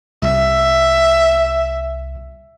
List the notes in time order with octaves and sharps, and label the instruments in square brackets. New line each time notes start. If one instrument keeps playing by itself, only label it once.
[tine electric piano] C2 [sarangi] E5